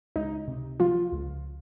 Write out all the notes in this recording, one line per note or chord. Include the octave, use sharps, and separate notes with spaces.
C#2 D#4
C3
F3 F4
C#2